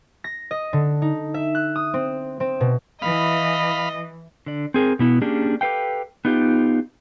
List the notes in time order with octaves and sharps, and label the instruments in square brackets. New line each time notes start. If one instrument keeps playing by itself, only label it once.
[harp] A#6
D#5
D3
D#4
E5
F#6
D#6
C4
C4
B2
[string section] E3 [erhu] D#5 [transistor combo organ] F5 B5
[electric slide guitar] D3 D5
C4 G#4 A#4
B2 B3 E4
A#3 C#4 D4 G4 G#4
G4 A4 B4 F5 G5
B3 D#4 F4 G4